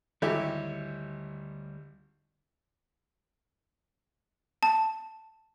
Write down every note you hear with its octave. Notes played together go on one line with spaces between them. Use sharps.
G#1 D2 G3 E4 G4 C#5
A5